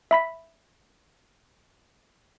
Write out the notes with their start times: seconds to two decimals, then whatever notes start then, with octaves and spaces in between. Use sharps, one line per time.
0.11 E5 B5 B6